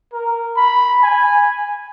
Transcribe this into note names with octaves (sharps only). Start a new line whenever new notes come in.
A#4
B5
G#5